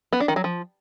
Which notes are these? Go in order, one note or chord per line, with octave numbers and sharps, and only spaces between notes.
B3
D4
D#3
F#3
F3